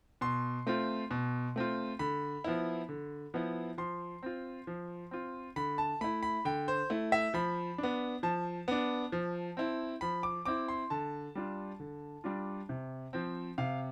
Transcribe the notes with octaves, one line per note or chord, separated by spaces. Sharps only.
B2 C6
A3 C4 F4
B2
A3 C4 F4
D3 B5
F3 B3 E4
D3
F3 B3 E4
F3 C6
C4 F4
F3
C4 F4
D3 B5
A5
A3 E4 B5
B5
D3 G5
C5
A3 E4
E5
F3 B5
D4
B3
F3 A5
B3 D4
F3
C4 E4
F3 B5
D6
C4 E4 D6
C6
D3 A5
G3 D4 F4
D3
G3 D4 F4
C3
F3 C4
C3 F5